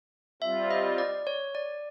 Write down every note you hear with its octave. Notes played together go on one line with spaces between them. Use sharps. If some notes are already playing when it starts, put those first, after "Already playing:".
G3 C4 F4 E5
D#5
D5
C#5
D5